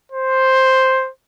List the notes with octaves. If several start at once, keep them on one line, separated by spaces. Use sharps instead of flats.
C5